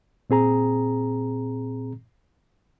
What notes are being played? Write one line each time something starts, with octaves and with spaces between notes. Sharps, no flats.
A#2 C4 G#4 A#5